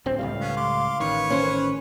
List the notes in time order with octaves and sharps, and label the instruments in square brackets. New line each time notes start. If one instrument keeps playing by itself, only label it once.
[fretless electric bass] D1 D2 C4
[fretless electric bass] C#2 A2 G3 [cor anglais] F5
[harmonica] B3 C#4
C6 D6
[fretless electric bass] A1 D#3 [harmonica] B4 C#5 C#6
[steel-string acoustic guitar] C#4 C5